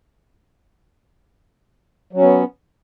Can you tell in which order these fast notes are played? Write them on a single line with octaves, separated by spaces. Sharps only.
F#3 C#4 B3